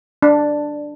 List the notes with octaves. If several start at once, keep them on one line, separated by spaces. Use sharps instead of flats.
D4